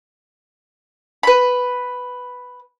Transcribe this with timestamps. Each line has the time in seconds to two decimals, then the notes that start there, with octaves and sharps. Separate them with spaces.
1.23 B4 B5